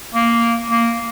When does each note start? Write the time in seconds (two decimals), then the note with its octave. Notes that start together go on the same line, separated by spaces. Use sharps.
0.14 A#3
0.71 A#3